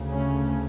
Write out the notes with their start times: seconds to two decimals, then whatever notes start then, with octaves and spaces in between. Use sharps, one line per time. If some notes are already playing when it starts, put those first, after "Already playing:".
Already playing: D2 C#3
0.11 A3 C#4